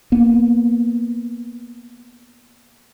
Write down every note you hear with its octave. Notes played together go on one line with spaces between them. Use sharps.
A#3 B3